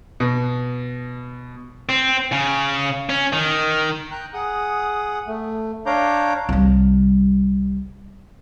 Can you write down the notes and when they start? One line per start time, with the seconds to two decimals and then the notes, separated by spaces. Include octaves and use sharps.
0.20 B2
1.89 C4
2.32 C#3
3.10 C#4
3.33 D#3
4.11 G5 A#5 F#6 G6
4.34 G#4 F#5 D#6
5.27 A3
5.86 D4 C#5 F5 A#5 D6 G6
6.49 C2 G3